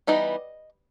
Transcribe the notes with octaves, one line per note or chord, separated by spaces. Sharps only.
E3 G3 B3 D#4 D#5